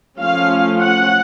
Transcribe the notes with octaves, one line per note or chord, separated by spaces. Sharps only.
F3 A3 C#4 F4 F5
F#5